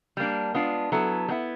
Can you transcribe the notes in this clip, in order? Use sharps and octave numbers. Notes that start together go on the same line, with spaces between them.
G3 A#3 D4
G#3 B3 D4 F4
F#3 B3 E4 A4
G3 B3 E4